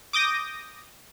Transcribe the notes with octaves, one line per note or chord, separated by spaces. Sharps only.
D6 D#6 G6 A#6